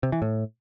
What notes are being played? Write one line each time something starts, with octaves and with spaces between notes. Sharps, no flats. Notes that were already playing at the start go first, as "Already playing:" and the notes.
C3
E3
A2